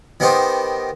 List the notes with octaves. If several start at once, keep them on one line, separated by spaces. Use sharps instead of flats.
D#3 B3 D#4 G4 C5